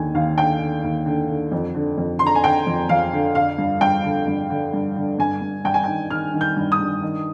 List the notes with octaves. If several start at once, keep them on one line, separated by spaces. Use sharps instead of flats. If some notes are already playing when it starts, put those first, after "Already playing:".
Already playing: D#2 D3 G#5
D#2 F5
D3 G5
D3
D#2
D3
D3
F2
D3
F2
D3 C6
A#5
G#5
D3 G5
F2
F2 F5
D3
D3 F5
G2
G2 G5
D3
G2
D3
G2
D3
G2 G#5
G2
G2 G5
G#5
D#3 G5
D#3 F6
D#3
G6
G2
D#6
G2
D#3